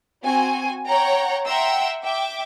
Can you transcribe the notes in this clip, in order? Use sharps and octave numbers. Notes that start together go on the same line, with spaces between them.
C4 F#4 G#5
C#5 F#5 G5 A#5
E5 F#5 G5 A#5 C6 E6
E5 G5 D6